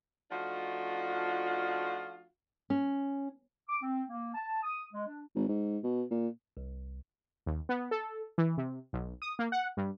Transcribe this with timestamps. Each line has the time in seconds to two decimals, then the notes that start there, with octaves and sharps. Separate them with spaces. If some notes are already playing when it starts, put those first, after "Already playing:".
0.31 F3 A3 D4 D#4 F4 F#4
2.70 C#4
3.69 D6
3.82 C4
4.09 A#3
4.34 A5
4.63 D#6
4.93 G#3
5.07 D4
5.35 G#1
5.48 G#2
5.84 B2
6.11 A#2
6.57 C2
7.46 D#2
7.69 B3
7.91 A4
8.38 E3
8.57 C3
8.93 B1
9.22 D#6
9.39 A#3
9.52 F#5
9.77 G2